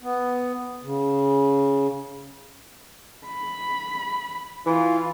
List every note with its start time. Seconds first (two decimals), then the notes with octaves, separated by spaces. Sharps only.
0.01 B3
0.83 C#3
3.27 B5
4.66 E3 F4